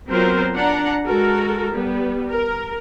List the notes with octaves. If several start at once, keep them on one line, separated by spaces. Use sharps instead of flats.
F#3 B3 C4 F4 A#4 C5
D4 F#5 A#5
G#3 F#4 A4 A#4
G3 B3
A#4